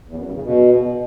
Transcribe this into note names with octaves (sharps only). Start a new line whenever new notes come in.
E2
F#2
G2
C#3
B2